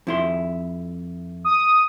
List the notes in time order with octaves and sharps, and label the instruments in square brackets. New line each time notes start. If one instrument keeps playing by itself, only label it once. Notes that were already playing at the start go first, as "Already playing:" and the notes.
[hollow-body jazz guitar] F2 E4 C6
[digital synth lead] D#6